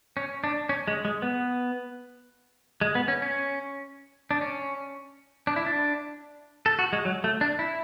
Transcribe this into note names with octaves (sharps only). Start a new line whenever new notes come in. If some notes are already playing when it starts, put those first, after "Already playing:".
C#4
D4
C#4
G#3
G#3
B3
G#3
B3
C#4
C#4
D4
C#4
D4
E4
D4
A4
F#4
G#3
F#3
A3
D4
E4